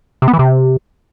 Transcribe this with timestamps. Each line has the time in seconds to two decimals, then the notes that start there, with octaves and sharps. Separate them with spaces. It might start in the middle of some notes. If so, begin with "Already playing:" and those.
0.22 C3
0.28 B3
0.33 E3
0.39 C3